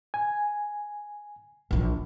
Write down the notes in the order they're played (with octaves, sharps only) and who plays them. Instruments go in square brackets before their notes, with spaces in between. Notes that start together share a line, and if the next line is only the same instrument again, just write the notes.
[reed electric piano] G#5
[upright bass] A#1 E3